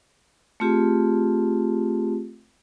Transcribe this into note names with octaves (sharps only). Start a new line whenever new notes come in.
A3 C4 F4 G4 G#4